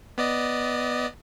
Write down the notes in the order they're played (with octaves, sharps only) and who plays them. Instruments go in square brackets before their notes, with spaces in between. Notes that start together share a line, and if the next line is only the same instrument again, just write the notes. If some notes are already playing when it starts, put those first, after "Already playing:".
[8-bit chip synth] B3 D5 D#5